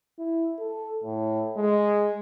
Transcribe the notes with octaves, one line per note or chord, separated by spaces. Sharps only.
E4
A4
A2
G#3